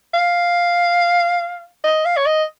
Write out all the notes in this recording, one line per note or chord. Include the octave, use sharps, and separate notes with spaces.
F5
D#5
F5
C#5
D#5